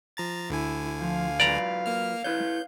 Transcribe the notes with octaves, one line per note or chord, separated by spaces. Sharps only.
F3 A#5 A6
D2 D3 E4 G#5
F3 F5
F#3 F4 B4 D5 A#5
A#3 F6
E4 B4 C#5 G6